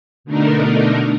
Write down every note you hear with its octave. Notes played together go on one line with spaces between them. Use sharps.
B2 D3 A3 D4 D#4 A#4